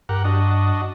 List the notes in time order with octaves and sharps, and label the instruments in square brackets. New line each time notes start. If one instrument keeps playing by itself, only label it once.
[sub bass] G2 [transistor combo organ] G4 A#4 F#5
[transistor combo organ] D4 F#4 D#5